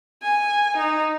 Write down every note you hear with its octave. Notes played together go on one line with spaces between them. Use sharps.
G#5
D#4